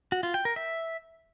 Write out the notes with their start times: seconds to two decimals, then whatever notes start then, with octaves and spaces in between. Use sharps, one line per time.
0.12 F#4
0.23 F4
0.34 G5
0.45 A#4
0.56 E5